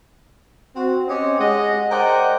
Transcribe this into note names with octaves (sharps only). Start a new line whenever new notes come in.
C4 F#4
C4 C#4 G4 C#5 D#5
G#3 D#5 F#5
A#4 C5 D5 D#5 F#5 G5